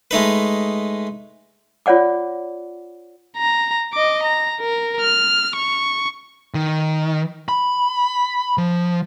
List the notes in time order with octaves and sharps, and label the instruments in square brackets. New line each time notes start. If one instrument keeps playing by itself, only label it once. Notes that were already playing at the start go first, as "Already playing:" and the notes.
[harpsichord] G#3 A3 D#4 B4
[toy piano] F4 C#5 D5 F#5 D6
[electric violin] A#5
D#5 D6
A#5
A#4
F6
C#6
[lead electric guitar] D#3
B5
F3